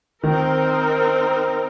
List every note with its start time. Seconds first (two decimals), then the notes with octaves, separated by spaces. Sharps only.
0.23 D#3 C4 D#4 A#4